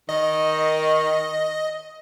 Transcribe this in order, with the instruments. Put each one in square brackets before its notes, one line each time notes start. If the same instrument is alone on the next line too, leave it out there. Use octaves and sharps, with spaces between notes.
[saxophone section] D#3 [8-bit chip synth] D#5